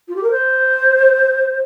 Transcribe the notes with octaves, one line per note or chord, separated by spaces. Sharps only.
F4
G4
A#4
C5